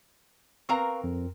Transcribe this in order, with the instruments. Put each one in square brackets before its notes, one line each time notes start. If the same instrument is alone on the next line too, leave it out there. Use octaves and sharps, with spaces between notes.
[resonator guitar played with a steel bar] C4 A#4 A#5 [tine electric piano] B4 F5 C#6
[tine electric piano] F2